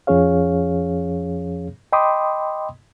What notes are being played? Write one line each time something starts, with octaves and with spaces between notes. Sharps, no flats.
F2 F3 C#4 G#4 C#5 F5
D#5 G5 B5 C6 D6 D#6